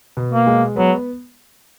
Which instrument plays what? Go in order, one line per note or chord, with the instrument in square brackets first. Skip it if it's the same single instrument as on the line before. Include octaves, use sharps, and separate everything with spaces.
[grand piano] B2
[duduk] A#3
[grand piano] G#3
[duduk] F#3 [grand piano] B3